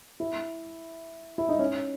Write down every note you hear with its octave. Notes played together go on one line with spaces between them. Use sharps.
E4
E4
D#4
C#4